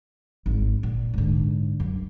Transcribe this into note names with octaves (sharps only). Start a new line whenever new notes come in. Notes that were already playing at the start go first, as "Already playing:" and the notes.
G#1
A#2
G#2 D3
F#2